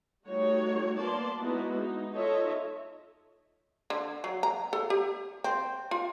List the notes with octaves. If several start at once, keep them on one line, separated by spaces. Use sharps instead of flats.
G3 A3 D#4 F#4 C#5
A#3 B3 D5 A5 C6
G#3 B3 D#4 E4 F#4
D#4
D#4 F4 A4 C#5 D#5 E5
D3
F#3
A#5
A4
G4
C4
F4